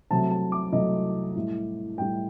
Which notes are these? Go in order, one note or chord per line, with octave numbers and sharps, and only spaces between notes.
C2 C3 F#3 A3 A5
A5
D6
C2 C3 F#3 A3 D#5
A2 G3
A2 G3 G5